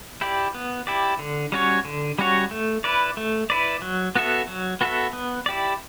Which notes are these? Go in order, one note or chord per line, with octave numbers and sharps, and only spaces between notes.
E4 G4 D5
B3
E4 G4 D5
D3
G3 C#4 F#4 C#5
D3
G3 C#4 F#4 C#5
A3
E4 B4 D5
A3
E4 B4 D5
F#3
B3 F#4 A4 E5
F#3
B3 F#4 A4 E5
B3
E4 G4 D5